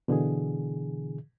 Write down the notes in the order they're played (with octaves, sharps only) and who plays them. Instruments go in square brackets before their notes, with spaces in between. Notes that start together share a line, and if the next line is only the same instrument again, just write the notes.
[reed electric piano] B2 D3 E3 G#4